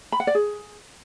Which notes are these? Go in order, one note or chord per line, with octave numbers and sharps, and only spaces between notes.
B5
F#5
D5
G#4